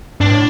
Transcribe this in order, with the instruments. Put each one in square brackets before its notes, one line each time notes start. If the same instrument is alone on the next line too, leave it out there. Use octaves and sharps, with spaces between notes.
[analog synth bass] G2 [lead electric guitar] D4
[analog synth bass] A2